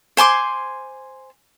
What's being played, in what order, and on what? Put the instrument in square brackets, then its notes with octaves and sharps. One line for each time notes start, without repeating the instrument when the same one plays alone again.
[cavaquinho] C5 G#5 C6 D6